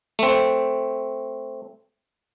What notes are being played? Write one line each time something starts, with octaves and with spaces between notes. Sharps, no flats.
A3 C4